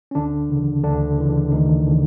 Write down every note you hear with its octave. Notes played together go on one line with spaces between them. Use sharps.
C#4
D2 D3 D4
C#3 E3
D2 D3 D4
C#3 E3
D2 D#3 D#4
C#3 E3